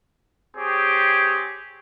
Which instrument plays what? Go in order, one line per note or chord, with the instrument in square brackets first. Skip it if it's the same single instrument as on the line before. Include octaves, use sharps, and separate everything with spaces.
[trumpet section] C4 G4 G#4 C#5